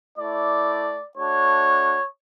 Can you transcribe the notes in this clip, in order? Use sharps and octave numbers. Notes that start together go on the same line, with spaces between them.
A3 E4 D5
A3 D4 F#4 C#5